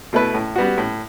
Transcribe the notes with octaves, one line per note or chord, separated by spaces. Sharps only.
B2 A3 E4 B4
A2
G3 B3 F#4
A2